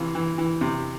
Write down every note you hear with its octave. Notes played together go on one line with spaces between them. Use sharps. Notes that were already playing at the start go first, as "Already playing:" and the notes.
Already playing: C3 E3 F4
E3
E3
C3